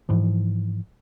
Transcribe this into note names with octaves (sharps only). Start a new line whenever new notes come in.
G#2 E3 F3